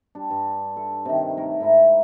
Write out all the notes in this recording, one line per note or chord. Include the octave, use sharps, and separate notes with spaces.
G3 D4
G2
A4
C3 D#3
A3 A#4 C#5
G#2 E4 E5 A#5